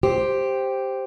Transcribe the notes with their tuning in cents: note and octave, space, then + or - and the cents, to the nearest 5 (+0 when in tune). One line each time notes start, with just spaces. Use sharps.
G4 +0 C5 +0